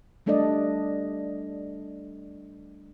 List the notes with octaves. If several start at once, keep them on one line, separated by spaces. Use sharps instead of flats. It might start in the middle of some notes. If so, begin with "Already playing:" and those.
G3 A3 D4 A4 D5 D#5